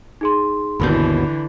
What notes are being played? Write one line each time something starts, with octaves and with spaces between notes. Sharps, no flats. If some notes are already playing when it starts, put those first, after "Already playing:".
D#4 G#4 C6
G#1 D#2 B2 D3 E3 B5 G6